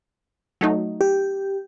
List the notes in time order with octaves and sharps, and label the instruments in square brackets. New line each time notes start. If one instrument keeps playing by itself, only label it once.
[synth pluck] F#3 A3 D#4
[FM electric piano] G4